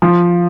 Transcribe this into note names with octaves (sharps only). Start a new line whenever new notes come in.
F3